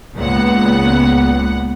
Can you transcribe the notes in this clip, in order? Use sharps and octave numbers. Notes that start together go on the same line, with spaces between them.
C#2 A#2 B3 F#5